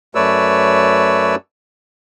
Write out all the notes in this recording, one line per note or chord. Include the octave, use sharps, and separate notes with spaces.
F#2 A3 B4 C#5 D5 E6